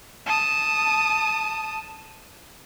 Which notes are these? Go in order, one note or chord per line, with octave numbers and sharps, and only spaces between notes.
A5 D#6